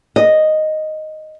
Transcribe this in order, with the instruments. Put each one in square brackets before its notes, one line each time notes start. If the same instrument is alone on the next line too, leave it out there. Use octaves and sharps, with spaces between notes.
[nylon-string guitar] D#5